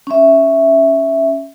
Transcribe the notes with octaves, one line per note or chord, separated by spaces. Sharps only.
C#4 E5